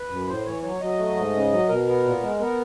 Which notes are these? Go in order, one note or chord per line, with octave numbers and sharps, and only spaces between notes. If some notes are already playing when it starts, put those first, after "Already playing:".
Already playing: B4
F#2
A2 C5
E3 C#5
F#3 C#5
F#3 D#5
A3
G#2
C#3
F#3
B2 A#4
B3
A#2
G#3
B3 A#4